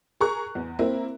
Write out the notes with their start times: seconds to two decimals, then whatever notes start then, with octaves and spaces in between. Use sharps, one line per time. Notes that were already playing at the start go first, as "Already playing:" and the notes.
0.20 G#4 A#4 A#5 C#6 F#6
0.55 E2
0.79 A#3 C4 E4 A#4